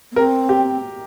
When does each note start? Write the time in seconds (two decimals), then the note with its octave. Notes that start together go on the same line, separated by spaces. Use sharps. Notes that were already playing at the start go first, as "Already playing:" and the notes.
0.12 A#3
0.16 C4 A#4
0.49 G4